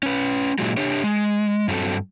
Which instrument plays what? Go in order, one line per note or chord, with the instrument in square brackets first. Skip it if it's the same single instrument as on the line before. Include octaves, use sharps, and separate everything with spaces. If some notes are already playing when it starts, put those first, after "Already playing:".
[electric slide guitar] C#4 B4
A#2 F#3 G#3
D4 G4 C#5
G#3
G2 F#3 C4 G#4 A4